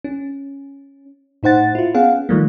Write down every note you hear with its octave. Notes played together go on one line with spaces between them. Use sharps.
C#4
A2 D#4 C5 F#5 A6
E4 F4
B3 C#4 G#4 F5 F#5
D#3 F3 G3 A3 A#3